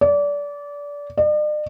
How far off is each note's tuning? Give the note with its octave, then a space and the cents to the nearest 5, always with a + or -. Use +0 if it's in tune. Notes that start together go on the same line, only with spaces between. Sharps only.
D5 -25
D5 +45